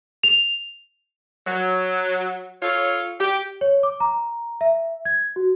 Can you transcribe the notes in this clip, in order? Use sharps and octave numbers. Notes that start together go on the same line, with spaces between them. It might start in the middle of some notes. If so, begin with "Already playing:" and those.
F7
F#3
F4 A4 C#5
G4
C#5
D6
A#5
E5
G#6
F#4